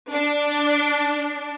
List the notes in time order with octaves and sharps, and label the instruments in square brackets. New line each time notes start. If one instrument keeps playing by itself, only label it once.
[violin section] D4